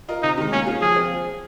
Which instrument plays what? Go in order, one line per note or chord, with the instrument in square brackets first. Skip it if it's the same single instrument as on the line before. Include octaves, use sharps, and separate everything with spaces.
[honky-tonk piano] F4 A#4 D#5
[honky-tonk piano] C3 [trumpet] D#4
[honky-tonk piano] D#3 G#3
[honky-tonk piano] A#3 [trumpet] C#4
[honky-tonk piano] C#4 F4 G#4
[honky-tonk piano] F3 [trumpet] G#4
[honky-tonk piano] C4 F4